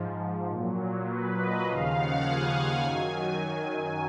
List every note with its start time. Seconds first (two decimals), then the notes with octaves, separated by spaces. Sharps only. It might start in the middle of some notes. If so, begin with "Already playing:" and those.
Already playing: G#2 F3
0.50 A#2
0.55 F#3
1.09 B4
1.38 D#5
1.67 D#2 C#3 F3 F5
1.96 F#5
2.25 G#5
2.83 F#2 D#3 F#3